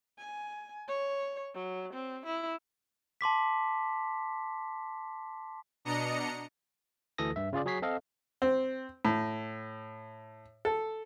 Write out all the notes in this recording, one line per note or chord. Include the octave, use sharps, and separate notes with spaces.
G#5
C#5
F#3
C4
E4
A5 C6 D6 B6
B2 D4 D#5 A#5 C#7
D2 E3 A4 D#6 A#6
G2 E5
C#3 F4 G#4 D5
F#3 G#4 C#5 B6 C7
C4 A4 D#5 F5
C4
A2
A4